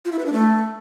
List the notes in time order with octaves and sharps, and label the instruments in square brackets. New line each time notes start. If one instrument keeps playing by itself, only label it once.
[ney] F4
E4
B4
D4
A3